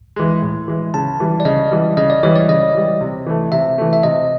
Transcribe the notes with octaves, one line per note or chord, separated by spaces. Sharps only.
E3 G#3
A2
E3 G#3
C#3 A5
E3 G3
D5
C#3 D#5
E3 G3
C#3 D#5
D5
E3 G3 C#5
D5
C#3 D#5
E3 G3
C3
E3 A3
C3 E5
E3 A3
E5
C3 D#5